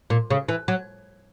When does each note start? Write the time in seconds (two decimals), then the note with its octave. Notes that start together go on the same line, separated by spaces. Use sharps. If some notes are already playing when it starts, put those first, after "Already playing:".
0.10 A#2
0.30 C#3
0.48 E3
0.68 F#3